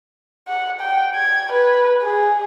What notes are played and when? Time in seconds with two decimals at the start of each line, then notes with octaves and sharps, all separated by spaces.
0.48 F#5
0.81 G5
1.15 G#6
1.52 B4
2.03 G#4